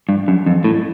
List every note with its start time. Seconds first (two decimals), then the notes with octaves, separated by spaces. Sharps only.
0.09 G2
0.28 F#2
0.46 F2
0.64 A2